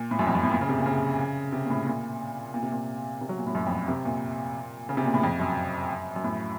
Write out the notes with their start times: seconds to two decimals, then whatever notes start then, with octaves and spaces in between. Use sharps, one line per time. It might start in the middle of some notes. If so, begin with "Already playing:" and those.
Already playing: A#2
0.11 A2
0.19 F#2
0.27 F2
0.35 F#2
0.43 A2
0.52 A#2
0.61 C#3
0.69 C3
0.77 A#2
0.86 C#3
1.52 C3
1.65 A#2
1.70 A2
1.87 A#2
2.54 A#2
2.63 C3
2.72 A#2
3.21 C3
3.29 F#3
3.38 A#2
3.47 A2
3.55 F#2
3.66 F2
3.88 C3
4.05 A#2
4.89 C#3
4.97 C3
5.05 A#2
5.14 A2
5.23 F2
5.40 F#2
6.16 F#2
6.24 A2